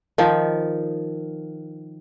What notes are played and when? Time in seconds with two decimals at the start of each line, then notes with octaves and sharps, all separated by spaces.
0.18 D#3 F3